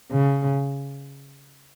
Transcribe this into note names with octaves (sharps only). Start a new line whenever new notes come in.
C#3